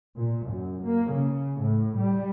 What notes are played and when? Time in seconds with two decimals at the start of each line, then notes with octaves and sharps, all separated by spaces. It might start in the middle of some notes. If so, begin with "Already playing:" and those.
0.16 A#2
0.47 F#2
0.83 A#3
1.12 C#3
1.62 A2
1.97 G3